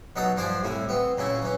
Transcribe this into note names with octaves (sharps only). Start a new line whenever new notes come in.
B2 F#3 D#4 A4 D#6
G2 F3 D4 C5 D5 G#5
C2 A2 E4
B3 C4
A#2 C#3 C#4 E4
E3 C#4